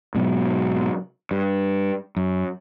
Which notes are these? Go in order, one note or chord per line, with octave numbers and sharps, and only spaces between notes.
G#2 B2 F#3
G2
F#2